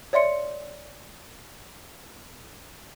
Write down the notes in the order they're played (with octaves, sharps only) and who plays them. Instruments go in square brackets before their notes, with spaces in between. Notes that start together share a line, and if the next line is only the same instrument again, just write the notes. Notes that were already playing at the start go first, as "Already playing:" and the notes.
[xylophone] C#5 D5 E5 C6 C#7